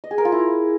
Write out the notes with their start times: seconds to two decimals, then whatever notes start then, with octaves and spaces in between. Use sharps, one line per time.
0.04 D#5
0.11 G#4
0.18 A#4
0.25 F4
0.32 E4